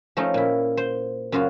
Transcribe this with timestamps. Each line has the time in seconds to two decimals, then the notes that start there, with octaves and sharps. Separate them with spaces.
0.17 F3 A3 C#4 D#4
0.34 A#2 E4
0.77 C5
1.32 F#2 C#3 F4 F#4 C#5